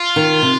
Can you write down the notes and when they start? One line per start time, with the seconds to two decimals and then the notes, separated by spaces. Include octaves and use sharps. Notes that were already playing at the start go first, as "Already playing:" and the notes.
Already playing: F4
0.16 D#3
0.42 C3